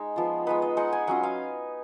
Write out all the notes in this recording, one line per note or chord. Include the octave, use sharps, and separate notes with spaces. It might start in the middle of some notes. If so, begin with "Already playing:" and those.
Already playing: G#3 D#4
F3 B3 F4
G#3 B3 D#4 B4
D#5
G#3 D#4 F#5
G#5
F#3 C#4 F4 F#5
F5